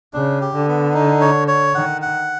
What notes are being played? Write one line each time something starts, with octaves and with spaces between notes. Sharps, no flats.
C#3 D4
G4
D3
B3
D#4
C#5
C#5
D#3 F#5
F#5